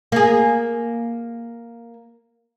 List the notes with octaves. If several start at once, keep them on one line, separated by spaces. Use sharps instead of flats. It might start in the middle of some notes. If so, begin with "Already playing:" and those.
A#3 G#4